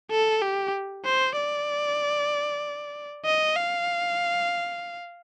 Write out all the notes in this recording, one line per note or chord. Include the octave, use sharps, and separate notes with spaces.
A4
G4
C5
D5
D#5
F5